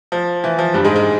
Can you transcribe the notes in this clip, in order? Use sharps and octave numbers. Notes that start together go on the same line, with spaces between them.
F3
E3
F3
G2 G3
G#2 G#3
G#3